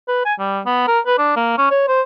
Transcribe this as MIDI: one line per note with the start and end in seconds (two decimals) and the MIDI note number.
0.08 0.24 71
0.25 0.34 80
0.39 0.61 55
0.66 0.84 59
0.87 0.99 70
1.06 1.17 71
1.18 1.36 62
1.36 1.54 58
1.57 1.69 61
1.71 1.86 73
1.88 2.01 72